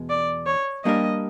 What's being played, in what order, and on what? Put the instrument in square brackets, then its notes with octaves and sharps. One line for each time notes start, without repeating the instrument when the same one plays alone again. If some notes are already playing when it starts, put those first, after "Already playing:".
Already playing: [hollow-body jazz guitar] E2 B2 G#3
[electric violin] D5
C#5
[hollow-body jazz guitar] G3 A#3 D4 G4 A#4 [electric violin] D#5